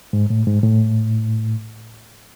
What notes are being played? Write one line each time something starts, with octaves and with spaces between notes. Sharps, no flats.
G#2
A2
G#2
A2